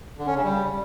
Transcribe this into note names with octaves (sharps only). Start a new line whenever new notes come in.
D3
C#4
C#3
G3